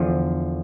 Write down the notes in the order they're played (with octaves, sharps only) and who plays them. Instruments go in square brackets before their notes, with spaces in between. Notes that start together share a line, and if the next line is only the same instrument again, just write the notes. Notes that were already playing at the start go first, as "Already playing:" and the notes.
Already playing: [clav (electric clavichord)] E2 D3 F3